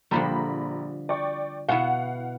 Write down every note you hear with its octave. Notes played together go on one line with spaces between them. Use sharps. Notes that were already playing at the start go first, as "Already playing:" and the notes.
A#1 D3 F3 G3 A#5 B5
D5 G5 C#6
B2 B3 E4 F5 F#5 C#7